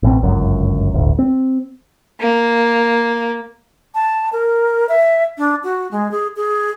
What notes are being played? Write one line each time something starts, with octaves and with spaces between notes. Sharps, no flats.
A1 B2 C4
G1 C#2 F#2
D1 G1 D2
C4
A#3
A5
A#4
E5
D4
F#4
G#3
G#4
G#4